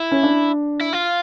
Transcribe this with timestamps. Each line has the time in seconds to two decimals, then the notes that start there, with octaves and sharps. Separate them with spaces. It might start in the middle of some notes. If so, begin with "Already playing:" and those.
Already playing: E4
0.12 C#4
0.23 D4
0.81 E4
0.93 F4